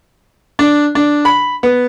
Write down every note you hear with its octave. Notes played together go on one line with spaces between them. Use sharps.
D4
D4
B5
B3